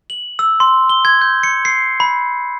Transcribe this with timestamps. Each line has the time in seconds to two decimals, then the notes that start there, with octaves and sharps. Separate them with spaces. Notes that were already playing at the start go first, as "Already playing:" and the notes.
0.10 F#7
0.39 E6
0.60 C6
0.89 G7
1.05 G#6
1.21 G6
1.43 C#7
1.65 C7
2.00 B5